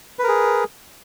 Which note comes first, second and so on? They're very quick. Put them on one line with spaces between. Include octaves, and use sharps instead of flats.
B4 A#4 G#4